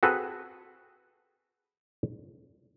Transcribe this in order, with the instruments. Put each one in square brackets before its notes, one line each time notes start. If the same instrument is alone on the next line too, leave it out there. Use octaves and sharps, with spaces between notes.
[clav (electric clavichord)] C4 F#4 G#4 A4 B4